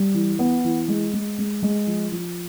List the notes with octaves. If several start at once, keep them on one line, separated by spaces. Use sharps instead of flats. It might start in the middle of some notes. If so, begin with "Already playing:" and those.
Already playing: G3
E3
B3
E3
G#3
G#3
G#3
G#3
F3
F3